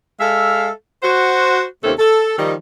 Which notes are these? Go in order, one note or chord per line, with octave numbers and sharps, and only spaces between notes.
G#3 A4 E5 F5
F#4 C5
D#2 C3 C4 C#4 A4
A4
D#3 F3 G3 D#4